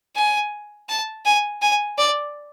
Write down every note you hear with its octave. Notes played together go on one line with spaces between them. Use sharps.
G#5
A5
G#5
G#5
D5